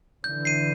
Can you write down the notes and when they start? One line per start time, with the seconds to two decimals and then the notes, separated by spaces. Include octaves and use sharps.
0.24 D3 E3 G6
0.45 C7 D#7